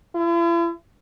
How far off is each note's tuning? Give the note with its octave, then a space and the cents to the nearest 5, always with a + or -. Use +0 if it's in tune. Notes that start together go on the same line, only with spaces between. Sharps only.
E4 +45